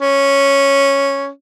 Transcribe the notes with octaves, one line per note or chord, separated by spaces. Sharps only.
C#4